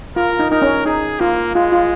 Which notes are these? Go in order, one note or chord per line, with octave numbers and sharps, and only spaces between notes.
F4 A#4
D#4
D#4 A#4
C#4
D#4 G#4
A#3 F4
G#3 F4
F4